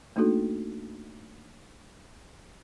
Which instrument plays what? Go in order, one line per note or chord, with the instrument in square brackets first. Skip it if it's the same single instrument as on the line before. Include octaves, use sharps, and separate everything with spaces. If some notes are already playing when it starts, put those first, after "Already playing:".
[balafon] A3 A#3 D4 D#4 F#4 A4